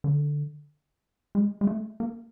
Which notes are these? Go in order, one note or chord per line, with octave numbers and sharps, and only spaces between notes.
D3
G#3
G#3
A3
A#3